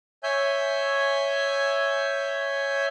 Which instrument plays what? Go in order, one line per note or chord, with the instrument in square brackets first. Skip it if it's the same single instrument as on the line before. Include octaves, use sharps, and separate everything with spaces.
[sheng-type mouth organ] C#5 E5 G#5 G6